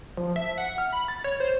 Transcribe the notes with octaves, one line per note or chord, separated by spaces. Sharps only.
F3
E5
F#5
F6
B5
A6
C#5
C5